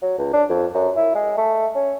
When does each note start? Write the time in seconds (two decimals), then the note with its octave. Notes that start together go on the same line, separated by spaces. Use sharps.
0.02 F#3
0.18 C#2
0.33 D4
0.50 F2
0.74 F#2
0.97 E4
1.15 G#3
1.37 A3
1.75 C#4